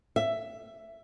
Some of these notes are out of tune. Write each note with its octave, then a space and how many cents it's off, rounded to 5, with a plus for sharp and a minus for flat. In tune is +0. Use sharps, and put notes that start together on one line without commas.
E5 +10